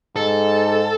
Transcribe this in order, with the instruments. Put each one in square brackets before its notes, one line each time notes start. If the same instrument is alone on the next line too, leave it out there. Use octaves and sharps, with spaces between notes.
[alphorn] G#2 [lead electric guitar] A4